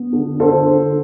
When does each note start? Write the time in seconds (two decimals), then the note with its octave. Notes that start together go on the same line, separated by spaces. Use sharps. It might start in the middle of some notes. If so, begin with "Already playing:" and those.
Already playing: B3
0.13 D3
0.40 D3 A4 C5
0.68 D3